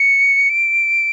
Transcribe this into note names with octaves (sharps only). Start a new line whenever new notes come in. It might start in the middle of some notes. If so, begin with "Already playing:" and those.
Already playing: C#7
D7